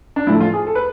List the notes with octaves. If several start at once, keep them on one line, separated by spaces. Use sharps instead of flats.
D4
A2 F3 A3 E4
F4
G#4
A4
B4